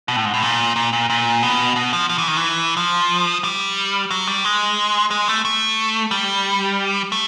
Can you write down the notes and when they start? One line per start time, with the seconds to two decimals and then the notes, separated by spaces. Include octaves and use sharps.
0.08 B2
0.16 A2
0.25 G#2
0.34 A2
0.42 A#2
0.76 A#2
0.93 A#2
1.10 A#2
1.43 B2
1.76 B2
1.93 F3
2.09 F3
2.18 E3
2.27 D#3
2.37 E3
2.77 F3
3.44 G3
4.11 F#3
4.27 G3
4.44 G#3
5.11 G#3
5.28 A3
5.45 A3
6.11 G3
7.12 A3